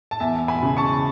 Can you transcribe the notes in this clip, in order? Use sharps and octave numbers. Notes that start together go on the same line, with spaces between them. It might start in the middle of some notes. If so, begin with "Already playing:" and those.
A5
E2 E5 G#5
G#5 B5
C#3
A5 C#6